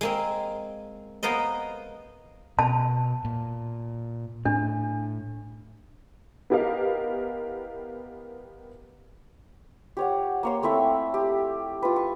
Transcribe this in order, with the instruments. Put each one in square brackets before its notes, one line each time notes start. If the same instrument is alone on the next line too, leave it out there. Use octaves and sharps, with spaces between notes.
[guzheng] G#3 A#3 C4
G#3 A#3 B3 A#4 C5 D#5
[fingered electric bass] B2 [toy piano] A5
[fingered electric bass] A#2
[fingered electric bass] A2 [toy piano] D4
[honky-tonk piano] B3 E4 G4 A#4 D#5 F5
[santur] G4 C#5 F#5
A#3 C#5 C6
A3 C4 E4 E5
G4
F4 B4
C#6